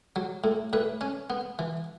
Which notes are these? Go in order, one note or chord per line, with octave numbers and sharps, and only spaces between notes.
F#3
A2
A2 B4
C#4
B3
E3